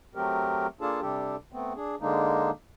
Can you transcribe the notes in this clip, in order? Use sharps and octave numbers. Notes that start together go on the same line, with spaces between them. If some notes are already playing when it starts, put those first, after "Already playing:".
F#3 A3 C4 G4 A#4
A#3 D4 F4 G#4 A4 A5
C3 G3 D4 G4 A4
A3 B3 C4
D4 G#4
D3 G#3 A#3 D4 D#4